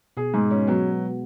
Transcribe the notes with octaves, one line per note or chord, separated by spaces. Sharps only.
B2 G#4
G#2 G#3
G#3 C#4
F#3 B3